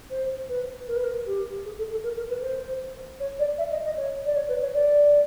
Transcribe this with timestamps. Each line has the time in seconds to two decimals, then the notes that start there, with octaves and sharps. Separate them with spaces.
0.10 C5
0.49 B4
0.88 A#4
0.96 B4
1.04 A#4
1.26 G4
1.65 G#4
1.78 A4
1.91 A4
2.04 A#4
2.17 A#4
2.29 B4
2.42 C5
3.20 C#5
3.39 D5
3.58 E5
3.71 D#5
3.84 D#5
3.97 C#5
4.25 D5
4.36 C#5
4.49 B4
4.61 C#5
4.74 D5